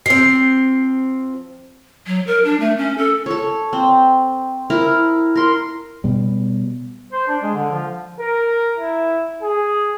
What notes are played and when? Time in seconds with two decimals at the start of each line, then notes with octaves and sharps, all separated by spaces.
0.06 F3 C4 C7
2.07 F#3
2.27 A#4
2.44 D4
2.60 A3
2.78 C#4
2.98 A4
3.26 A4 C#5
3.73 C4
4.70 E4 A#4 A#5
5.35 A#4 C6
6.04 B2 G3
7.13 C5
7.28 D4
7.43 G#3
7.55 D3
7.72 F3
8.19 A#4
8.78 E4
9.42 G#4